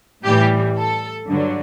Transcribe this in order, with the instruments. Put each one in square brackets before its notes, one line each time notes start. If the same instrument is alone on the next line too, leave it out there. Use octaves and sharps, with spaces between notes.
[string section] A2 E3 G3 G4
A4
G2 D3 F#3